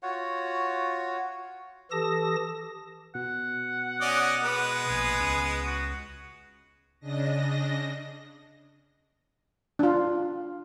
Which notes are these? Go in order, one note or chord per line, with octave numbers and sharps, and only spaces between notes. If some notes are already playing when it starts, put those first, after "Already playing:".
F4 F#4 C#5 F#5
E3 G4 A4 A5 D#6 A#6
B2 F#5
C#4 D5 D#5
G#3 B3
A#1 G#4
C#2
F#4
C#3 D4 D#5 A#6
D4 F4